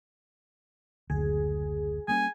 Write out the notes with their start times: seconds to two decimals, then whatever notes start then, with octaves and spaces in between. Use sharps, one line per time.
1.10 F#1 D2 G#4
2.08 G3 A#3 C#4 G#5